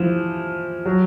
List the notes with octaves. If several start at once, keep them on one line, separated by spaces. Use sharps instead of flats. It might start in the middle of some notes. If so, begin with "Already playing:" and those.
Already playing: E3 F3
F#3